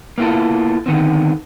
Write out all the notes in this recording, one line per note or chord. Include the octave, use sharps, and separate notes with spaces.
A#3 B3 E4 F4 A4
D3 D#3 B3 C4